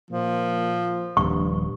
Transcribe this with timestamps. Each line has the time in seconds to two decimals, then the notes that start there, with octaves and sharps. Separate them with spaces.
0.11 A#2 F3
1.17 D#1 A#1 G2 C#6